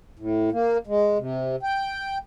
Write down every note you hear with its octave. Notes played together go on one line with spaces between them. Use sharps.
A2
A#3
G#3
C3
G5